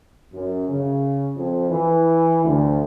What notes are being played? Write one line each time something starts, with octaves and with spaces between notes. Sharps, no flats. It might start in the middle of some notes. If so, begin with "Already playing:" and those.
F#2
C#3
F2
E3
D2